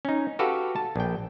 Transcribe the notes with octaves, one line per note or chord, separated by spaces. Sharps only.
C#4 D#4
F#4 G4 A4 B4 F5
A5
A#1 G5